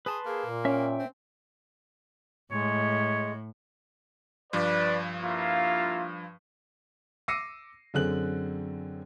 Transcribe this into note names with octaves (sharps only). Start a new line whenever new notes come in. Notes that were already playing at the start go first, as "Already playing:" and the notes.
G#4 B4 A5 C6
A#3 G#4
A#2
C#4 E5 G5
C4
A2 G#3 C#5
G2 F3 B4 D5
A#3 E4 F4
D6 E6 A#6 C7 C#7 D#7
F#2 D3 C4 G#4 F#6 F#7